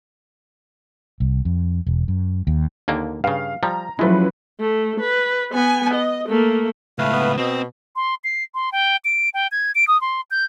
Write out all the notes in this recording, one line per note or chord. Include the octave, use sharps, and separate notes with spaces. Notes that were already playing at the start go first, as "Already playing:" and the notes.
C2
F2
E1
F#2
D#2
D#2 D3 A#3
G2 C#3 F5
F3 G3 A#5
F3 F#3 G#3 A3 C#4 E4 B4
A3
B4
B3 G#5
D#5
A3 A#3
C#2 A2 A3 B4 F5
B3
B2 C4 D#5 D#6
C6
C7
C6
G5
D7
G5
G#6
D7
D#6
C6
G6